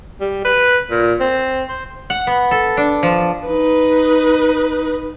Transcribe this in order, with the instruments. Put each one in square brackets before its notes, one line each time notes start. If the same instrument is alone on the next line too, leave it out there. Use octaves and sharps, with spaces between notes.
[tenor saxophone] G3
B4
A#2
C4
C5
[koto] F#5
B3
A4
D4
F3
[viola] D#4 B4